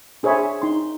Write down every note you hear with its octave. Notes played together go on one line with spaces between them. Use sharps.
D4 G#4 C5 C#5 E5 B5
D#4 C6